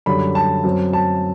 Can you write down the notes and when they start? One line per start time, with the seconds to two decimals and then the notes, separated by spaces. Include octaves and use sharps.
0.06 F#2 D3 G3 B5
0.35 A5
0.64 F#2 F#3 C4
0.93 A5